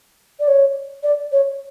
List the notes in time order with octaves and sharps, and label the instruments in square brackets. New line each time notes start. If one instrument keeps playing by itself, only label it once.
[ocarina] D5
C#5
D5
C#5